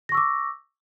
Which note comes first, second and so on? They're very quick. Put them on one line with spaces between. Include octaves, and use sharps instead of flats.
A#6 C#6 E6 D6